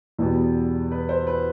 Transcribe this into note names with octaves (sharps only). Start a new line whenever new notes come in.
E2 B2 G3
B4
C5
B4